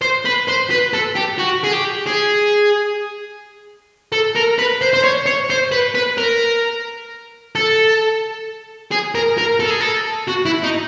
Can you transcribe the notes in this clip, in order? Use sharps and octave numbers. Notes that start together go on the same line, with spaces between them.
C5
B4
C5
B4
A4
G4
F#4
G#4
G4
G#4
A4
A#4
B4
C5
C5
C#5
C#5
C5
B4
B4
A#4
A4
G#4
A#4
A#4
A4
G#4
A4
F#4
E4
D#4